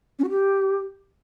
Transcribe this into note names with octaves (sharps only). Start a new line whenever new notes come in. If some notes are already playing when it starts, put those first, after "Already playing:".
C#4
F#4
G4